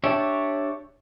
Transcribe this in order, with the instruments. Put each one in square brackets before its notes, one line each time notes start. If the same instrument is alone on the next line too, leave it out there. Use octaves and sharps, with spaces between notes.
[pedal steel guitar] D4 G4 C#5 D5 E5